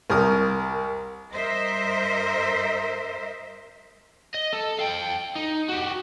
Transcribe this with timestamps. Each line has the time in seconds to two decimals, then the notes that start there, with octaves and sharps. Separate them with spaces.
0.10 C2 A#4 D#6
1.33 G2 A#4 C5 D#5 E5
4.34 D#5
4.53 A4
4.79 F5 G5
5.35 D#4
5.69 F#4 G4